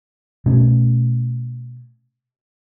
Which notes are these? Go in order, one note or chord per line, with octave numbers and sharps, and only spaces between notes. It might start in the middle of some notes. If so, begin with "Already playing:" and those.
B2 A3 C#4